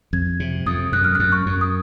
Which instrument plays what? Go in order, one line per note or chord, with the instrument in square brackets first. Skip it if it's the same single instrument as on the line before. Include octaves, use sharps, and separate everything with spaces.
[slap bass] F2 [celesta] G#6
[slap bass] C3
[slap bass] F2 [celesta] D#6
[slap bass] F#2 [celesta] F#6
[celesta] F6
[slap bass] F#2 [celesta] F#6
[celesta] C#6
[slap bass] F#2
[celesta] D#6